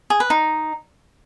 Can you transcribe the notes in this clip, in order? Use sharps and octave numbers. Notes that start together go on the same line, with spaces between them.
G#4
B4
D#4